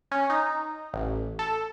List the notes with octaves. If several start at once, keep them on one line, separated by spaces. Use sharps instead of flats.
C#4
D#4
A1
A4